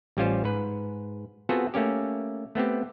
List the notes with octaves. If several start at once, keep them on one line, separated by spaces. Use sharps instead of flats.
A1 G3 C#4 F4 C5
G#2 B4
B3 C4 F4 F#4 G#4 A4
A3 A#3 C#4 G4
A3 B3 C4 G4